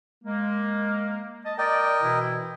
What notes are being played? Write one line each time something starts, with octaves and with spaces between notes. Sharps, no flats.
G#3 A#3
D#5 A5
A#4 D5 D#5 G5
B2 E3 E4